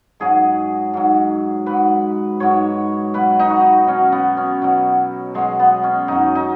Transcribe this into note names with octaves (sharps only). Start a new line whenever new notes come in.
G#2 F#3 G#4
G#2 F#3
G#2 F#3 B4
G#2 F#3 C#5
B2 F#3 B4
D#4
F#4
B2 F#3 C#4
B3
C#4
B2 F#3
B2 F#3 G#3
B3
C#4
F#2 F#3 D#4
D#4